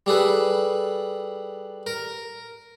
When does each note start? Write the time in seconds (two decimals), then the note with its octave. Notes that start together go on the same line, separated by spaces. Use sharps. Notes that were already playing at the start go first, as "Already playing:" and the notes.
0.06 G3 G#4 A4 B4
1.87 A#4